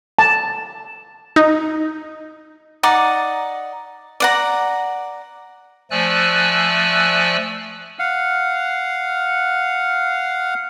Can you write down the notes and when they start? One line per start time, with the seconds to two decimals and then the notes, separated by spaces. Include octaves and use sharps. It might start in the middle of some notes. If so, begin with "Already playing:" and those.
0.19 A5
1.36 D#4
2.83 D#4 D5 F#5
4.20 D5 F#5 A#5
5.91 F3 A3 D5 G#5 E6 F#6
7.99 F5 F#5